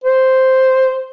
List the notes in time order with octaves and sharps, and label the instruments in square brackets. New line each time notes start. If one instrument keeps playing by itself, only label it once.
[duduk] C5